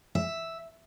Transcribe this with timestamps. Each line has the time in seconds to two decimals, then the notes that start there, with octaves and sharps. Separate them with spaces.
0.15 E5